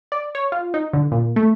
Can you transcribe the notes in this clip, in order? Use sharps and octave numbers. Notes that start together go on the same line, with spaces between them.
D5
C#5
F4
D#4
D3
A#2
A3